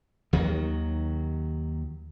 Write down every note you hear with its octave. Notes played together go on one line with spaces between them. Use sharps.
D#2 D#3 F#3